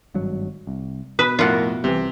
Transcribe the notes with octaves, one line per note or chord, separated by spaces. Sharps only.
G#1 G2 F#3
C2
B2 B4 D#6
F2 A2 F4 A#4 F#5
C2 C3 E3